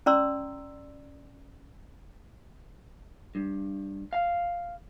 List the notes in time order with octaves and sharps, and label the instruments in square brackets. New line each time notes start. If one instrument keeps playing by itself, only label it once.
[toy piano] C#4 D5 A#5 C6 E6
[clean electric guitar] G2
F5